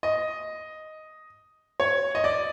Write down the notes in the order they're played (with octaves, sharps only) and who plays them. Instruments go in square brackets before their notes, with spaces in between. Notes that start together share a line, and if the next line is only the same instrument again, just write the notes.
[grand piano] D#5
C#5
D#5
D5